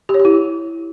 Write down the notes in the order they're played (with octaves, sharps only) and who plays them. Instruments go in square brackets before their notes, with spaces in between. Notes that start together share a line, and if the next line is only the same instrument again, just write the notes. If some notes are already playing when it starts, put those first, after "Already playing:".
[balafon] G4
C#5
G4
E4